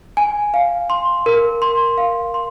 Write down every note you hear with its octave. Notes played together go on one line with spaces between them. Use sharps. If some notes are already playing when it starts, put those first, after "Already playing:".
G#5
F5
C6
A#4
C6
F5
C6